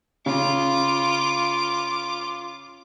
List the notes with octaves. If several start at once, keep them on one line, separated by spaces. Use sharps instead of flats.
C#3 F4 D6